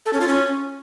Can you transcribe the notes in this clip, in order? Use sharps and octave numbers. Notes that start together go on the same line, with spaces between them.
A4
C#4
F4
C#4